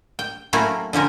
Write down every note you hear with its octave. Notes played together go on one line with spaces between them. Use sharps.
G5
F#3 A3 A#3 C#4 E4 F#4
D3 F3 C#4 A#4